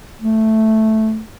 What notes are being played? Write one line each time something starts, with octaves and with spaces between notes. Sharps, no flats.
A3